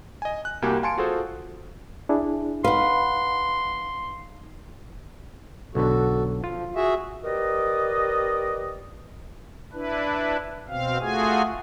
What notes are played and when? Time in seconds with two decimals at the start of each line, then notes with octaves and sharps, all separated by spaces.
0.22 D#5 G#5
0.45 F#6
0.62 C2 A#3 F#4 G4 G#5
0.83 F5 G#5 A5 C6 C#7 D7
0.98 F4 F#4 G#4 A4 C5
2.09 D4 E4 G#4
2.64 D#4 B4 F5 F#5 C6
5.75 B1 D3 B3 F#4 A4
6.44 F3 F4
6.76 F#4 G#4 E5
7.24 G4 A#4 B4 D5 D#5
9.73 D4 E4 B4
10.68 B2 C4 F5
11.01 A3 F4 F#4 G#4 G#5